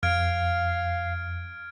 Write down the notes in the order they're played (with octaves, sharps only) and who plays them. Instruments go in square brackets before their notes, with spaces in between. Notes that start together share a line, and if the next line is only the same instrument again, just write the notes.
[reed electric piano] F2 [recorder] F5 [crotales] F6 G#6 D7